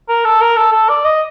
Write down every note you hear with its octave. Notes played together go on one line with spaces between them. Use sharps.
A#4
A4
A#4
A4
A4
D5
D#5